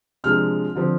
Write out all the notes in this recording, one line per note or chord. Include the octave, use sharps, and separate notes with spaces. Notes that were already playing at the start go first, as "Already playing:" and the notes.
C3 F3 G#3 D4 F6
D3 F3 C4